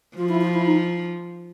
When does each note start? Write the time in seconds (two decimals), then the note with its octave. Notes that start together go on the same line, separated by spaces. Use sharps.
0.17 F3 F4
0.29 E4
0.41 F4
0.53 E4
0.66 D#4